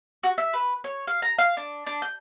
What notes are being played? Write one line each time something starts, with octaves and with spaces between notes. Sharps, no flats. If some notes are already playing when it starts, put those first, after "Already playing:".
F#4
E5
B4
C#5
F5
A#5
F5
D4
D4
G6